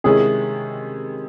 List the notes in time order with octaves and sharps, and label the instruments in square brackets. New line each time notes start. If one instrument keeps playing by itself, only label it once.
[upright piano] C3 D#3 G#3 C#4 E4 [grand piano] G#4